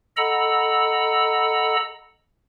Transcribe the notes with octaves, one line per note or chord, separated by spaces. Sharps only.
A4 D#5 F#5 A#5 B5 E6